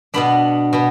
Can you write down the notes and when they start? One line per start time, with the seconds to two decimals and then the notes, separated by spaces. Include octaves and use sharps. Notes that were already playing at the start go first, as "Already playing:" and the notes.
0.14 B2 B3 D4 B5
0.73 B2 B3